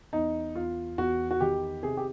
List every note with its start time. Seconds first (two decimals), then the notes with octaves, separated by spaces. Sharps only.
0.13 E2 D#4
0.55 E2 F4
0.98 E2 F#4
1.31 F#4
1.41 D#3 G4
1.83 C3 G#4
1.97 G4